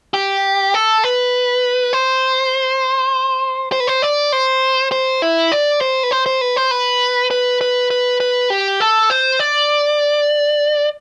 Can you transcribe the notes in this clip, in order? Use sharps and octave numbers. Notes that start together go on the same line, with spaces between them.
G4
A4
B4
C5
C5
B4
C5
D5
C5
C5
E4
D5
C5
B4
C5
C5
B4
C5
B4
B4
B4
B4
B4
G4
A4
C5
D5